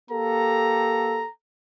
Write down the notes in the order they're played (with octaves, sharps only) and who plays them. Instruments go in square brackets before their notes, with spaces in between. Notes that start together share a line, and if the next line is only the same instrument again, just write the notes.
[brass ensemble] A#3 G4 A4 [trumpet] A#5